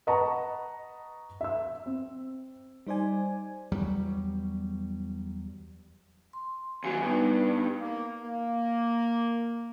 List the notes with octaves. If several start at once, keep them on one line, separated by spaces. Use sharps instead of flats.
B4 D#5 F#5 A5 A#5 C#6
E5 E6
C4
G3 D#4 C5 D5 G#5
E2 F#3 G3
C6
D#2 F#3 G#5
G2 B3 D#4
A#3
A#3